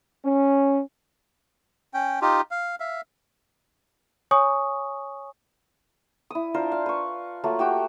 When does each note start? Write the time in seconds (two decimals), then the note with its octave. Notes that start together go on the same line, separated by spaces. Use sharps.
0.24 C#4
1.94 C#4 G5
2.22 D#4 F4 G4
2.51 F5
2.80 E5 F5
4.31 C#5 G#5 C#6 D#6
6.31 E4 D#6
6.54 D4 F4 A#4 C5
6.72 F5
6.86 B4 C#6
7.44 F#3 A3 A#3 F4
7.59 F#4 G4 G5